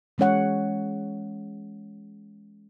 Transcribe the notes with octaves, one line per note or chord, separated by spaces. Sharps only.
E3 G#3 C#4 C#5 F#5